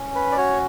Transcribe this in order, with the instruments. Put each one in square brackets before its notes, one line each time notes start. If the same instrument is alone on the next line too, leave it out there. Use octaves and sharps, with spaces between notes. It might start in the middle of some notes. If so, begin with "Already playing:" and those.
Already playing: [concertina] C#4
B4
D5
F#4 C#5